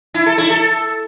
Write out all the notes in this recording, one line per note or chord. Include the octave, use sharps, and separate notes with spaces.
E4
A4
E4
A4